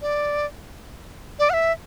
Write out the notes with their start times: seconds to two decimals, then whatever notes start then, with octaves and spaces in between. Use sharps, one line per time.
0.02 D5
1.39 D5
1.50 F#5
1.53 E5